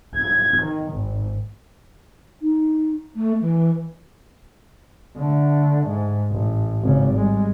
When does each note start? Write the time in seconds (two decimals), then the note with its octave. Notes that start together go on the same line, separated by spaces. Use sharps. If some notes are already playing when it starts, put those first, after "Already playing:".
0.15 G#6
0.62 D#3
0.92 G#1
2.42 D#4
3.16 A3
3.41 E3
5.17 D3 A3
5.87 G#2
6.32 A1
6.83 G#1 C#3
7.14 G3 G#3